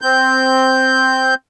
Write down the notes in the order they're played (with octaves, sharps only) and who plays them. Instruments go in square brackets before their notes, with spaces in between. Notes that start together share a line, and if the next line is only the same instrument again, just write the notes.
[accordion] C4 G6